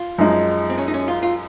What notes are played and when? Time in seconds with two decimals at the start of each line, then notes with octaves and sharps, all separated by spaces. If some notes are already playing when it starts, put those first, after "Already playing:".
Already playing: F4
0.18 F#2 F3 G#3 D#4
0.70 C4
0.78 C#4
0.88 D#4
0.94 C#4
1.08 F4
1.23 F4